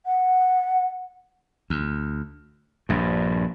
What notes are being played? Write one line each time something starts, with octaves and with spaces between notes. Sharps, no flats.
F#5
D2
A#1 G2